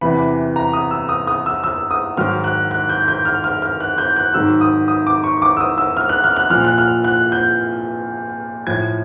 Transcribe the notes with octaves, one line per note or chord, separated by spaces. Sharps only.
E2 C3 E3 B5
A#5
D#6
E6
D#6
D#6
E6
E6
D#6
G#2 D#3 F#3 F6
F#6
F#6
G6
G6
F6
F6
F6
F#6
G6
F#6
G#2 D#3 F#3 E6
D#6
D#6
D6
C#6
D6
E6
D#6
E6
F6
F#6
F6
F#6
A#2 F3 F6
F#6
F6
F#6
G6
A2 F3 G#6